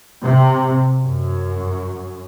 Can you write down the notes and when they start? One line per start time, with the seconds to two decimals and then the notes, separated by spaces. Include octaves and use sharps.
0.23 C3
1.01 F#2